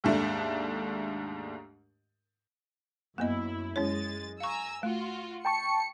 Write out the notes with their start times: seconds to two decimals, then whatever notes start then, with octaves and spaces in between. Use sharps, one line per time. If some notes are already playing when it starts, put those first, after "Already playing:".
0.04 D#2 G#2 A3 D4
3.18 F#2 A#3 B3 E4 D#5
3.76 F#2 G#3 C#4 E4 C#5 A6
4.40 F5 G#5 A#5 C#6 E6
4.83 A3 F4 F#4
5.45 G5 A5 C#6 C#7